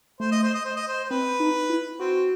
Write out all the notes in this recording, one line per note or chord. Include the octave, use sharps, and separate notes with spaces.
A3 C5
D#5
C5
D#5
C5
D#5
C5
C5
C4 B4
D#4
E4
C4 F#4